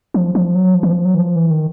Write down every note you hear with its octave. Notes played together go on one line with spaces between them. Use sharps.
F3
F3
F#3
F3
E3
F3
F#3
E3
F3
E3
D#3